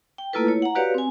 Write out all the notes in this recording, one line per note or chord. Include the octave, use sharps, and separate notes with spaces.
G5
A3 A#3 E4 F4 A4 B4
E4 C#5
F#5 A#5
F#4 G4 B4 C#5 D5 F5
C4 G#5